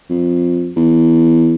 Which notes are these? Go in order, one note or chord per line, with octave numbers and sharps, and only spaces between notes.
F2
E2